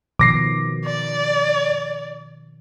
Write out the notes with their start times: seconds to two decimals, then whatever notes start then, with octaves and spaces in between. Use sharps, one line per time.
0.19 B2 D#3 F3 D6 A#6 C7
0.85 D5